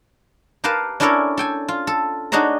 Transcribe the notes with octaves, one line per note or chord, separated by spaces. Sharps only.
G4 A#4 B4 F5 A5
C#4 D4 E4 A4 A#4 C#5
A4 G5 G#5
F4
A4
D4 D#4 F#4 G#4 C#5 A#5